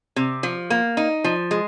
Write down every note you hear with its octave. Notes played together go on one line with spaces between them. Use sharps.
C3
F3
A#3
D#4
F3
G#3